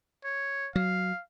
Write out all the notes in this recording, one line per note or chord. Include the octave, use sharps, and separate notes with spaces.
C#5
F#3 F5